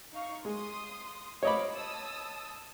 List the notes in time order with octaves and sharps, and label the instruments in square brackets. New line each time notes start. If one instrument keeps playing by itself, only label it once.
[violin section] D#4 F5 C#6
[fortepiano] G#3 [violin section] C6 D#6
[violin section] C5 F5 D6 [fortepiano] C#5 D#5 B5
[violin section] A5 D#6 E6